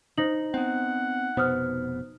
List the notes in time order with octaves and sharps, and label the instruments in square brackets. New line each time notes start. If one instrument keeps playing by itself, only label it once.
[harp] D#4 [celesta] C5 A#6 F#7
[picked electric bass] B3 C4 [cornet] F#5
[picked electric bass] F1 B2 B3 [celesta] C5 D#6 F6